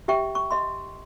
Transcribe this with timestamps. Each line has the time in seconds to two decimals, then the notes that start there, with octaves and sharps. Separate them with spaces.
0.08 G4 E5 G5 C#6
0.35 C#6
0.51 D#5 C6